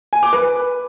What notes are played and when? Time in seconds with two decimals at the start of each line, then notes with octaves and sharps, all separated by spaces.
0.13 G#5
0.23 D6
0.33 B4